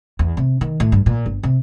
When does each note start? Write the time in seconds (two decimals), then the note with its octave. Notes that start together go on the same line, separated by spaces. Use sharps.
0.19 E2
0.37 C3
0.61 D#3
0.80 A2
0.92 G2
1.06 A#2
1.26 G1
1.43 C3